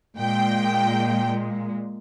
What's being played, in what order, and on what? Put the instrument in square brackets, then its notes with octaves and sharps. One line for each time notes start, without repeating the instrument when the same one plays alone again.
[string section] A#2 G#3 G5